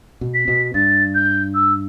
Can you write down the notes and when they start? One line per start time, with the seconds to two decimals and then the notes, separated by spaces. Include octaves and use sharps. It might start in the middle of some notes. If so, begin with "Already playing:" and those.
0.21 B2
0.34 B6
0.48 B2
0.74 G2 A6
1.15 G6
1.54 E6